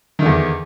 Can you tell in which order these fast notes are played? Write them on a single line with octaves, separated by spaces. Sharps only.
D#3 D3 E2